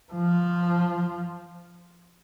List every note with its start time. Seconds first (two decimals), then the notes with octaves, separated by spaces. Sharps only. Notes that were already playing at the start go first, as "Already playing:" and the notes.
0.13 F3